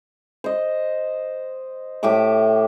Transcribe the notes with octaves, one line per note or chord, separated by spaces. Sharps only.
C5 D#5
A2 G4 E5 D6